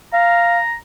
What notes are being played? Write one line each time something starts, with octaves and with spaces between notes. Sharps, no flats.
F5 A#5